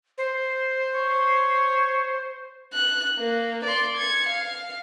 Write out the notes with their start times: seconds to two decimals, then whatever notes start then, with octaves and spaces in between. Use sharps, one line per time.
0.18 C5
0.94 C#5
2.73 F#6
3.19 A#3
3.65 D5 C6
3.97 G#6 C#7
4.29 F5